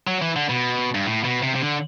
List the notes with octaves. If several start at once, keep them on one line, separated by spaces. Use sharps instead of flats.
F#3
E3
D3
B2
G2
A2
B2
C3
C3
D3